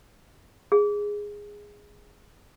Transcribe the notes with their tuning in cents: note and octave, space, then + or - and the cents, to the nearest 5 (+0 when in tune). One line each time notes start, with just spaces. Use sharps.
G#4 -10